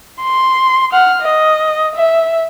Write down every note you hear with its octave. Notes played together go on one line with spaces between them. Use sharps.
C6
F#5 F6
D#5
E5